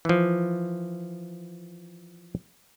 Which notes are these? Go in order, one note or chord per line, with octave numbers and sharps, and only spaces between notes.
E3 F3